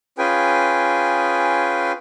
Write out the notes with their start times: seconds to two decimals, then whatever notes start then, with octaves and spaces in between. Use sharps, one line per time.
0.18 C#4 F4 G#4 B4 G5 G#5